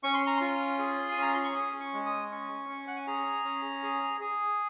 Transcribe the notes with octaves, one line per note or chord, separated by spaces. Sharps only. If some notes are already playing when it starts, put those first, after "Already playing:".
C#4 C#6
C6
A#5
F4 C6
G#4
G#5
C#4
A#5
C6
C#6
C#4 D#6
C#6
G#3
D#6
C#4 C#6
C#4
F#5
G#5
G#4 A#5
C#4
G#4
G#4